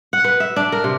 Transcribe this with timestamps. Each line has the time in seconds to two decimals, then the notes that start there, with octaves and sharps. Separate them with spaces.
0.13 F#5
0.24 B4
0.40 E5
0.56 D4
0.72 A#4
0.84 C3